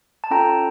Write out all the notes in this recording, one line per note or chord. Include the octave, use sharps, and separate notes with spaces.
A5
C#4 F4 A4 G5 A#5